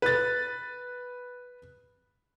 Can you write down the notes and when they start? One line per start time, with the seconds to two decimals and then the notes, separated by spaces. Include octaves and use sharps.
0.02 B4 A6